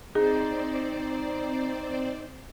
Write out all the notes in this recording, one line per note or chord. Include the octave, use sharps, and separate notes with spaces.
C4 D#4 G#4 C5 D5